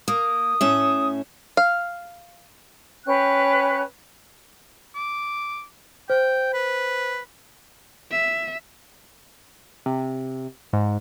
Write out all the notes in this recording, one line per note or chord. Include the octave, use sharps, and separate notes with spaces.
A#3 D#6
A2 C#4 E5
F5
C#4 B4 G5 F#6
D6
C5 G5
B4
E5
C3
G#2